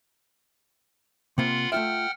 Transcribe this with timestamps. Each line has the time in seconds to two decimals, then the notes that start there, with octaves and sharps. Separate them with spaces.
1.38 C3 A#3 C4 F4 F#5 B5
1.72 A3 F4 E5 F#5 G5 F6